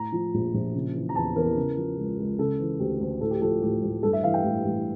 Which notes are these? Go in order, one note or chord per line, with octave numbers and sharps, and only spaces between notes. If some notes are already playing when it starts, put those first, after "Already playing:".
Already playing: A2 A#5
F3
A#1
A#1
C#3
E3
A#5
E2 A5
E2 A#4
C#3
F3
C#2
C#2
C#3 A4
E3
D2 G4
D2
A2 A4
G4
F3 A4
A1 G4
A1
G2 A4
E5
E3 F5
G5
A1
A1